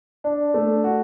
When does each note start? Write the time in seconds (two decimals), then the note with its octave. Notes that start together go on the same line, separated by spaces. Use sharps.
0.24 D4
0.54 A3
0.84 F#4